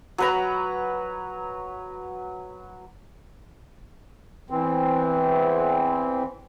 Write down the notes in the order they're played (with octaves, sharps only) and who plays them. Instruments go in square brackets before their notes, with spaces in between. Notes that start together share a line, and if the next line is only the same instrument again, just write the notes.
[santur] F#3 B4 A#5
[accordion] E2 E3 C4